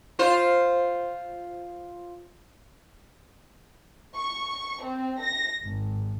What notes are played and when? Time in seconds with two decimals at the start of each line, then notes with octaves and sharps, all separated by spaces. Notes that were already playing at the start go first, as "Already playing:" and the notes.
0.19 F4 C5
4.15 C#6
4.81 C4
5.21 A#6
5.62 G#1